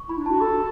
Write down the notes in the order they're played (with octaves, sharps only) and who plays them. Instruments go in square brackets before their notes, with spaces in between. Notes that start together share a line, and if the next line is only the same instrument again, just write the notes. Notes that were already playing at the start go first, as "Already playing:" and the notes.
Already playing: [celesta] C#6
[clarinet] E4 [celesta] B5
[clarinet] D4
[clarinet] F#4 [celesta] A5
[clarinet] A4 [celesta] B5